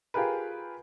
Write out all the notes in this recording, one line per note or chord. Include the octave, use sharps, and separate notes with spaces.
F4 G4 G#4 A#4 B4